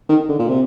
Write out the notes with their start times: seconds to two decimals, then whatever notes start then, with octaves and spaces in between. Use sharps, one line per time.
0.09 D#3
0.29 D3
0.39 A#2
0.48 C3